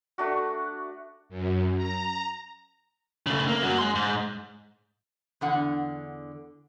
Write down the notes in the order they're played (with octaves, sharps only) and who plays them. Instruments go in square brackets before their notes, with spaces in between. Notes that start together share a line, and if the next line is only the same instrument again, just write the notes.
[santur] A3 D4 F#4
[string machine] F#2
A#5
[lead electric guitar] C#3 A3
A#3
F#2 F#3
G#3 C6
G#2
[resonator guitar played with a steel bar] E2 D3 F#5